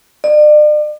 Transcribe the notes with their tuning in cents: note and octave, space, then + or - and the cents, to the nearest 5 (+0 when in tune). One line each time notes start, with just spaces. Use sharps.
D5 +40